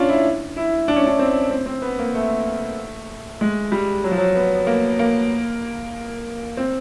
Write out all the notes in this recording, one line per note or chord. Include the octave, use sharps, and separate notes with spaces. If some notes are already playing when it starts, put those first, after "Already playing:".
Already playing: C#4 D4 F4
E4
E4
D4
C#4
D4
C4
C4
C4
B3
A#3
A3
G#3
G3
F#3
F3
F#3
B3
A#3
A#3
C4